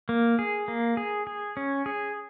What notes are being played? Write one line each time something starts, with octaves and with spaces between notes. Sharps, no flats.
A#3
G#4
A#3
G#4
G#4
C#4
G#4